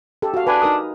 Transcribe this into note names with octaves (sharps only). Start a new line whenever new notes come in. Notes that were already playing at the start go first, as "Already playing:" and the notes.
G4 A4
F#4 F5
D4 B4 G#5
D#4 A#4 D#6